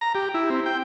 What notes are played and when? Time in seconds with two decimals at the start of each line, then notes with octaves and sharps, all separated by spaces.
0.01 A#5
0.15 G4
0.34 E4
0.50 C4
0.66 G5